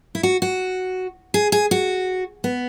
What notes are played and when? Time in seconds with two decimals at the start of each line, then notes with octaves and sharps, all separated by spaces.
0.15 E4
0.23 F#4
0.42 F#4
1.34 G#4
1.52 G#4
1.71 F#4
2.44 B3